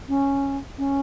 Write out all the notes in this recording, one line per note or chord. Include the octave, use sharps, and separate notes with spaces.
C#4
C#4